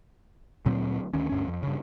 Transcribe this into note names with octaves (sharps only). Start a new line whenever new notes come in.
D2 A#2 F#3 C4
D2 D#3 C#4
D2 G2 C#4
F2
G2 C#3